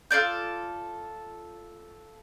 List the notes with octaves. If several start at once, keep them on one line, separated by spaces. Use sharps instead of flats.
F4 A4 D5 G6